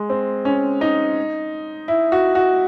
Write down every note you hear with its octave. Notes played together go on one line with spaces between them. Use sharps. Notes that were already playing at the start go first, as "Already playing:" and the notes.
Already playing: G#3
C4
C#4
D#4
E4
F#4
F#4